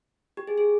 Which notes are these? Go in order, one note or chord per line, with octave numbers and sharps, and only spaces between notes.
G4
G#4
G#4